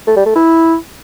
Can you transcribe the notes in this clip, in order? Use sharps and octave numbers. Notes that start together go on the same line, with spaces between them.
A3
G3
A3
E4